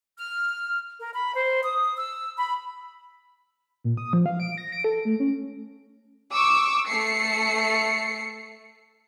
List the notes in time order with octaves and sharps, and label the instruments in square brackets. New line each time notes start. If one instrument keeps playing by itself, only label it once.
[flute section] F6
A#4
B5
C5
D#6
E6
B5
[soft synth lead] A#2
D#6
F3
F5
D7
A#6
D7
A4
A3
C#4
[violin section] C#6 D6 E6
A3 C7 C#7